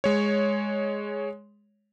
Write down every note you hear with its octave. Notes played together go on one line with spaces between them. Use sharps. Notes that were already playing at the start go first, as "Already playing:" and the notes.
G#3 C#5